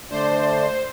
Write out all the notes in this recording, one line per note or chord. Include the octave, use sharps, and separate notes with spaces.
D3 A3 D4 C5 D5